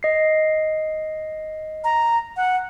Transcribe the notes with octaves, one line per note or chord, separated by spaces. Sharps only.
D#5 C7
A#5
F#5